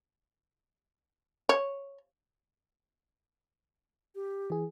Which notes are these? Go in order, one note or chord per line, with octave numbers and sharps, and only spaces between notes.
C#5
G4
E3 G#4